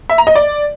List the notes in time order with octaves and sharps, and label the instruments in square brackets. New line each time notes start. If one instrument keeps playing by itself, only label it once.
[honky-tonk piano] E5
A#5
D#5
D5